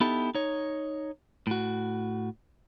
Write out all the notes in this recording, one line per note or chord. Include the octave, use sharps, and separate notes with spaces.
B3 D#4 E4 G4 A4
D#4 C#5
A2 F#4